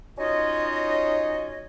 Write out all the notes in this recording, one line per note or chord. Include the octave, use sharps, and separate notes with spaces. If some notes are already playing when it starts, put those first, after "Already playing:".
C#4 D#4 F4 F#4 C#5 D#5